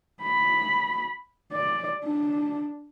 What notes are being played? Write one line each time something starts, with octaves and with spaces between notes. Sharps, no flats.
B5
D5
D4